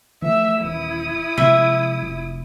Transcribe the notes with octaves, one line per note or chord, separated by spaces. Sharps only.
E3 F3 A3 E5 E6
D#1 E3 E4 D#6
C3 F3 G#3 E5
F1